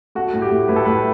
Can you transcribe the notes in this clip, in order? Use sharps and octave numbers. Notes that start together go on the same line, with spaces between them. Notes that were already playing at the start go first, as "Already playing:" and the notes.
A3 F#4
A2
G4
A2
A2 B4
A4
A2 B4